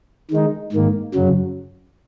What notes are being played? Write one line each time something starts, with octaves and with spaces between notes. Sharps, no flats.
D#3 G#3 D#4
G#2 D#3 A#3
F#2 C#3 F#3